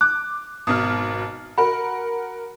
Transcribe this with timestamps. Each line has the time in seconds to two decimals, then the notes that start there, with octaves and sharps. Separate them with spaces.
0.01 D6 F#6
0.67 G#1 B2 D#6 F6
1.58 F#4 A#4 B5